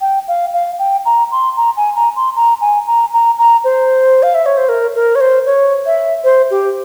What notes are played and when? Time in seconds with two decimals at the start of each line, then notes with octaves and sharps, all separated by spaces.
0.01 G5
0.28 F5
0.54 F5
0.79 G5
1.06 A#5
1.31 C6
1.57 A#5
1.77 G#5
1.95 A#5
2.16 C6
2.36 A#5
2.61 G#5
2.87 A#5
3.13 A#5
3.39 A#5
3.64 C5
4.23 F5
4.35 E5
4.46 C#5
4.57 C5
4.69 A#4
4.95 A#4
5.15 C#5
5.21 C5
5.46 C#5
5.86 E5
6.24 C5
6.50 G4